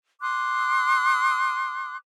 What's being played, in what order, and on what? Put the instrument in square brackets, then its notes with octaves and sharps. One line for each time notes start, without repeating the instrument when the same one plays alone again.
[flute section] C6 D6 D#6 F#6